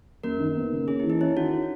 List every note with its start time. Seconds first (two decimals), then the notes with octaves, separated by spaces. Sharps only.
0.23 F#2 A#3 A#4
0.40 D#3
0.57 B3
0.72 C#3
0.88 C#4 G#4
1.00 E3 E4
1.10 D#4
1.21 C#4 E4
1.37 D#3 F#4